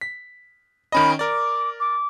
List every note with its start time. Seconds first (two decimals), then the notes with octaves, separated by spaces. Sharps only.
0.01 B6
0.92 D#3 C#4 D#5 B5
1.19 A#4 D5 D6
1.80 D6